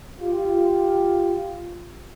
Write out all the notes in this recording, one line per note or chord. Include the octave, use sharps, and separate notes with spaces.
F4 G4